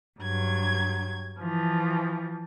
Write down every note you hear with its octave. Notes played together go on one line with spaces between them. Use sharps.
G2 F#3 G#6
E3 F3